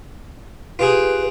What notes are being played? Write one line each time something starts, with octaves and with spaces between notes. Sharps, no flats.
F4 G4 G#4 B4